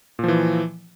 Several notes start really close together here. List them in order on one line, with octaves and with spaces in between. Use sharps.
A#2 F3 E3